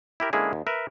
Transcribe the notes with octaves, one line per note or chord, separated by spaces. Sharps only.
E4 G4 A#4
D3 G#3 A#3 C#4 E4 G#4
D#2
A#4 B4 E5